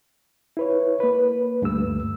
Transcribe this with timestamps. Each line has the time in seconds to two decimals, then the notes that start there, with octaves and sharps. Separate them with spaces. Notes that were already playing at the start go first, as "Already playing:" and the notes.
0.57 E4 B4 C#5
1.00 A#3 B4
1.62 D2 G2 A3 E6